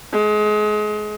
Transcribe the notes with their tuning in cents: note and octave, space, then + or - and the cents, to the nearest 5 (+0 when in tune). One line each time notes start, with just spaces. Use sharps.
G#3 +30